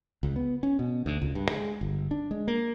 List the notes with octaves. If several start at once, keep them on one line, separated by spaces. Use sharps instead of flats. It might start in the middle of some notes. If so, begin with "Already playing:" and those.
C#2
B3
C#4
B2
D2
C#2
G2
G#3
G1
D4
G#3
A#3